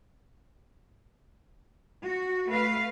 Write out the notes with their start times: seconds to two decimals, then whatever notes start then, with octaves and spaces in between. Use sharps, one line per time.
2.05 F#4
2.49 A3 B4 F5